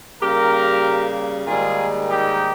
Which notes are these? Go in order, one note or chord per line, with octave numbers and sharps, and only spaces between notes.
C#3 G3 A#3 G4 A#4
G#2 D#3 G3 A#3 F4 G#4
D#4 G4